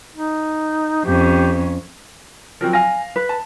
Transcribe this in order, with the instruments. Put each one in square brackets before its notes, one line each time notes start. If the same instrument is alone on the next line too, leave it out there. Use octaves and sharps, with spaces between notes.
[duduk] D#4
[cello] F2 C#4 [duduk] G4
[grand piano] F3 F#3 C4 [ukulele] A#4
[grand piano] F5 A#6 [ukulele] G#5
[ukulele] B4
[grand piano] A5